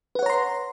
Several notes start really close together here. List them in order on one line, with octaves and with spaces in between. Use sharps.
B4 F#5 C#5 A#5 C6